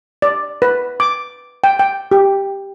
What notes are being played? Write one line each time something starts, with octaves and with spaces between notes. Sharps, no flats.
D5
B4
D6
G5
G5
G4